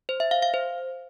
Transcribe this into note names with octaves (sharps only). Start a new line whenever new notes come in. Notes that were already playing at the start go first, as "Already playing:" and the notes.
C5
E5
F5
F5
C5